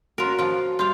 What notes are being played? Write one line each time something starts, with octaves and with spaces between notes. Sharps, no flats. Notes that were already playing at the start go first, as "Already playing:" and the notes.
C#4 F4 F#4 A#4
F3 F4
G2 F4 F5 G6